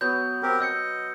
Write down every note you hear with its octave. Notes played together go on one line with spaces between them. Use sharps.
F#3 B3 G6
C4 G4 A#4
D#5 E6 G6 C#7